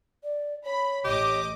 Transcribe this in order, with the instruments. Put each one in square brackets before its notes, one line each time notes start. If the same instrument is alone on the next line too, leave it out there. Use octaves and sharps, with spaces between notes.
[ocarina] D5
[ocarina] C#5 [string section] B5
[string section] A1 D#5 D6 [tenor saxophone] G4